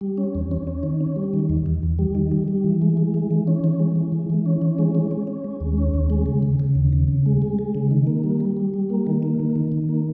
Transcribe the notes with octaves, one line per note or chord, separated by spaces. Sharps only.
G3
C#4
E2
C#4
C#4
D#3
C#4
G3
D#3
E2
E2
E2
G3
D#3
G3
G3
E3
G#3
G#3
E3
E3
C#4
E3
G#3
G#3
E3
E3
C#4
E3
G#3
C#4
C#4
C#4
G#3
D#2
C#4
D#2
G#3
C#3
C#3
C#3
D#2
C#3
C#3
G#3
G#3
G#3
C#3
D#3
A#3
G3
G3
G3
G3
A#3
D#3
A#3
D#3
D#3
D#3
A#3